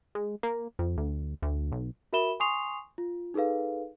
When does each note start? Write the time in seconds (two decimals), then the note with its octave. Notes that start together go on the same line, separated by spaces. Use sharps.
0.15 G#3
0.43 A#3
0.79 F2
0.98 D2
1.42 D2
1.72 B1
2.13 F#4 A#4 E5 B5 E7 G7
2.40 G#5 C6 C#6 D#6 C7 F7
2.98 F4
3.34 D#4 G#4 A4 B4 F5